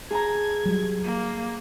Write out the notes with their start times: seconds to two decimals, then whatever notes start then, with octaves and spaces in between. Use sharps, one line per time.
0.11 G#4 A5 A#5 G#6
0.65 F#3 G3
1.05 A#3